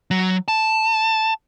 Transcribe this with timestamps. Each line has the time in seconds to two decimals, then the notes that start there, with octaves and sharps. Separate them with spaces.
0.11 F#3
0.48 A5